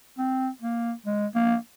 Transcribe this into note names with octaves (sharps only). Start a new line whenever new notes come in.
C4
A#3
G#3
A#3